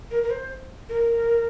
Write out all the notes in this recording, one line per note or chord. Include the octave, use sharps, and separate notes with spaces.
A#4
A#4
C5
A#4